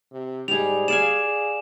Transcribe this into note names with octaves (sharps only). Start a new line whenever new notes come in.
C3
G#2 G3 G#4 F7
G#4 D5 F5 G#5 E7
G#4